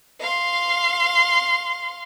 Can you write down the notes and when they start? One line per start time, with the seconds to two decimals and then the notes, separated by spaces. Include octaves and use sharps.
0.20 F5 C6